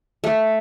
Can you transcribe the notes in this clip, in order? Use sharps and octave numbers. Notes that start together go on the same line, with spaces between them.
A3